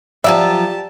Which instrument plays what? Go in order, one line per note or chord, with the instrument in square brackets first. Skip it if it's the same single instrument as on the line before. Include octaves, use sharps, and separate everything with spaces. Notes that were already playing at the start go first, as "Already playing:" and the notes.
[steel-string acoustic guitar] F3 F#3 F4 [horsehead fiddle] G4 A5 [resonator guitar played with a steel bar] D5 [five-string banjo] E5